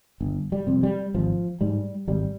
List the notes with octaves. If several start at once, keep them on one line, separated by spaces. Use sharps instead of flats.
G1
G3
F2 C3
G3
G#1 F3
G#2 G3
G#1 G3